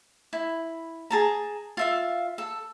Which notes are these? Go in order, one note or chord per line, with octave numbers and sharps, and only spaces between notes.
E4
G#4 A5 A#5
F4 E5 F5
A4